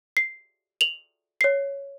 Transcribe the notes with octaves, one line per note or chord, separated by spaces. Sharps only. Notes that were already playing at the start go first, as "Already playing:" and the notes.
C7
F7 F#7
C#5 C7